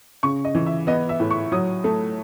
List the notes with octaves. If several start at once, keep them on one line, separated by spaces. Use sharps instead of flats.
C#3 C#6
D#5
E3
E5
B3 D#5
E5
A2
C#6
F#3 D#6
A3